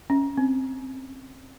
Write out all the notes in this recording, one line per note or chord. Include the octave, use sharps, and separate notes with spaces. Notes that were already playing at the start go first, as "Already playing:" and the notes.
C#4
C4